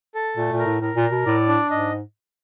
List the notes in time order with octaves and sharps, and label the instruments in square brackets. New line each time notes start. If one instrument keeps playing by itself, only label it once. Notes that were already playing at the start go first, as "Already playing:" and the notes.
[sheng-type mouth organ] A4
[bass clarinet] A#2 [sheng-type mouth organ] A3
[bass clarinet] A#2
[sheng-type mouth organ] A#4
[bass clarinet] A2
[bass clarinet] A2 [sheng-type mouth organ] A#4
[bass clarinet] A#2
[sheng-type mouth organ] A#4
[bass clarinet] B2
[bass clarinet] A2 [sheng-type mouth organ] D5
[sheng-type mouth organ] D4
[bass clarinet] G#2 [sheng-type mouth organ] D#5